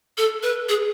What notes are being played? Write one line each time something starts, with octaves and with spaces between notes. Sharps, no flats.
A4
B4
G#4